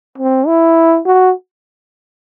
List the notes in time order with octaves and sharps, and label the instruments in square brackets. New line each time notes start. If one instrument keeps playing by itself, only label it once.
[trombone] C4
E4
F#4